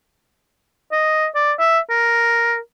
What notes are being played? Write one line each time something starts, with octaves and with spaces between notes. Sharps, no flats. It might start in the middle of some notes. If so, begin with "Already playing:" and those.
D#5
D5
E5
A#4